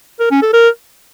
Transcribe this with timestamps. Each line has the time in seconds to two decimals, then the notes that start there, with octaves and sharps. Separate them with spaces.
0.20 A#4
0.31 C#4
0.42 A4
0.53 A#4